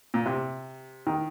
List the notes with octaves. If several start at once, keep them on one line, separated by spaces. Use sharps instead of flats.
A#2
C3
D#3